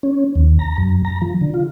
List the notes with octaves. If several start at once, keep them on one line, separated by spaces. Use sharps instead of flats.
C#4
D#2
A#5
F#2
A#5
F3
D3
F4